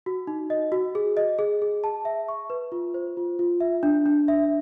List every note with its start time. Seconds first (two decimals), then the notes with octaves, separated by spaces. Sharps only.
0.06 F#4
0.27 D#4
0.50 D#5
0.72 F#4
0.95 G#4
1.17 D#5
1.39 G#4
1.62 G#4
1.84 A5
2.05 E5
2.28 C#6
2.50 B4
2.72 F4
2.94 C5
3.17 F4
3.39 F4
3.60 E5
3.83 D4
4.06 D4
4.28 E5